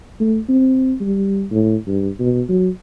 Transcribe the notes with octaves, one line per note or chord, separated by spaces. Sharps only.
A3
C4
G3
A2
G2
B2
F#3